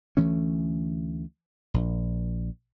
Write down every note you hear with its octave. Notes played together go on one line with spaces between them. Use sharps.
D2 E3 A3 C#4
A#1